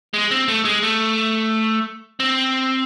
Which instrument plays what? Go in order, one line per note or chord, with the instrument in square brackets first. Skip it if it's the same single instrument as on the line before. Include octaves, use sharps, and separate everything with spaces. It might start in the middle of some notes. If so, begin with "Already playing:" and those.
[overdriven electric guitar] G#3
C4
A3
G#3
A3
C4